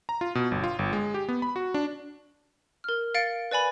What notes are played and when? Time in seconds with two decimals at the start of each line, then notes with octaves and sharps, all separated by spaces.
0.09 A#5
0.21 F4
0.35 B2
0.51 G1
0.64 F4
0.79 G1
0.93 G#3
1.14 G4
1.29 B3
1.42 B5
1.56 F#4
1.74 D4
2.84 A#4 F6
3.15 F5 A6 C#7 D7
3.51 B4 D5 G#5 B5